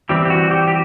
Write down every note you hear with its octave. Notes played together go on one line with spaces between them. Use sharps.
E3 G3 C4 G4
G4
F#4
G4
G4